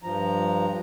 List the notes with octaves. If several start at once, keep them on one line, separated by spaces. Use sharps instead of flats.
G2 F3 A#5